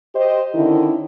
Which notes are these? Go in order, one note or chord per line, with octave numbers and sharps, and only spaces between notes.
G4 C5 D#5
D3 D#3 C#4 E4